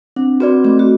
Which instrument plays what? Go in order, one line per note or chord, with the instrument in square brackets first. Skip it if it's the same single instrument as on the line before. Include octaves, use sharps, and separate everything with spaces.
[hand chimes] C4 [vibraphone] D4
[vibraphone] C4 [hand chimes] F#4 B4 D5
[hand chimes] A3 [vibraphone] C4
[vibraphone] F#4